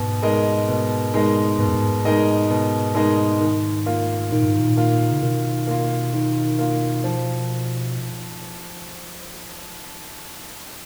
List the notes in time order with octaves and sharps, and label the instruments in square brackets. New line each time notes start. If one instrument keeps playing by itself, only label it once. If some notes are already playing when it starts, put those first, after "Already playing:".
Already playing: [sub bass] G#2 [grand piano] B2
[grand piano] G#3 D#4 A#4 D#5
B2
G#3 D#4 A#4 D#5
[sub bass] G#2 [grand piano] B2
[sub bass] F#2
G#2
[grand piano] G#3 D#4 A#4 D#5
B2
G#3 D#4 A#4 D#5
D#3
A#3 F4
[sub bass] A#2 [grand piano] D#3
[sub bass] G#2
A#2
[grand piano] A#3 F4
[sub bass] C#3
[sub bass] B2 [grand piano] D#3
[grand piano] A#3 F4
D#3
A#3 F4
F3